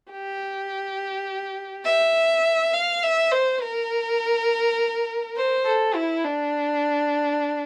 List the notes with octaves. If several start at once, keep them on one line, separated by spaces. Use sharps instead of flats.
G4
E5
F5
E5
C5
A#4
C5
A4
E4
D4